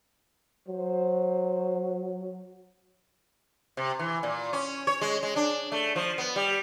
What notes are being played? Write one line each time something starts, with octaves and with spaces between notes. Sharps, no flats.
F#3 C5
C3
E3
A#2
C#4
C#5
G#3
G#3
D4
A3
F3
B3
G3